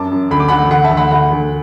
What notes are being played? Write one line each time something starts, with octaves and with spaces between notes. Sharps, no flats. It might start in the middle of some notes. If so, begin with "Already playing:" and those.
Already playing: F#2 A5 D6
F#2
D2 B5
D6
D2 F#5 B5
D2 F#5 B5
E5 A5
D2
F#5 B5
D2 F#5 B5
D2